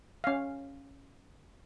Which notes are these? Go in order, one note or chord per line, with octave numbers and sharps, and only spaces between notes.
C#4 F5